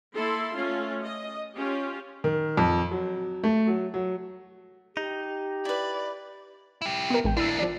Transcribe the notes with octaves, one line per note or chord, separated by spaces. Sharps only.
A#3 E4 A4 C6
A3 C#4 F4
D#5
C#4 F4 G4
D#3
F2
F#3
A3
F#3
F#3
D#4 G4
E4 B4 D5
E4 G4
B3 A#4
A1 G#3 G5
D#2 D4 E4 E6
F3 D5